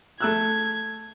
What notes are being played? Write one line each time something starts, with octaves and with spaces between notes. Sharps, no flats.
A3 E6 F#6 G#6